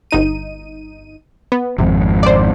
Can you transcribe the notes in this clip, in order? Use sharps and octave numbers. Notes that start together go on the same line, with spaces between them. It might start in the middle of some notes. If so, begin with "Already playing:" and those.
G1 D#4 D#7
B3
G#1 F2 G#2 C3
C5 D5